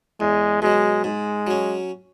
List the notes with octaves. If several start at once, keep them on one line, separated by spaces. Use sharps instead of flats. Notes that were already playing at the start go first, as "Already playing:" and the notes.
E2 G#3
B2 F#3 G#3
G#2 G#3
F#3 C#4